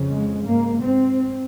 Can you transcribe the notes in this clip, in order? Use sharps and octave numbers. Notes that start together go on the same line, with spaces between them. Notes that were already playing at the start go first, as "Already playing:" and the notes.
Already playing: F2 C#3
G#3
G#2 A#3
C4